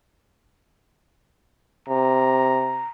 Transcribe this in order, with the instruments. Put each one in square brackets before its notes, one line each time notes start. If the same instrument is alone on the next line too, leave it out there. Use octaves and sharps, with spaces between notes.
[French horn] C3 [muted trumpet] A#5